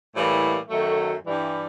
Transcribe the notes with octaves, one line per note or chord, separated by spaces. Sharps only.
A2 E3 G3 A#3
F#2 D#3 F#3 A3
G2 E3 G3